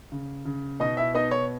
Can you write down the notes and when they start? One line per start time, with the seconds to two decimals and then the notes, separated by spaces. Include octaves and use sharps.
0.12 C#3
0.45 C#3
0.80 B2 D#4 D#5
0.97 E4 E5
1.14 B3 D#4 D#5
1.31 C#5